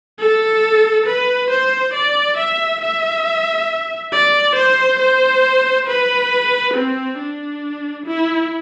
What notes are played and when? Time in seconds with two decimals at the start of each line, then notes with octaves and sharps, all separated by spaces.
0.19 A4
1.06 B4
1.50 C5
1.94 D5
2.37 E5
2.81 E5
4.12 D5
4.56 C5
5.00 C5
5.87 B4
6.74 C4
7.18 D4
8.06 E4